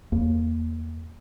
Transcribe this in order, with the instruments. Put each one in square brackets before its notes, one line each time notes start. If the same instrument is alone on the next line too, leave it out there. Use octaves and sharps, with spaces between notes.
[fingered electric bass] E2 A#3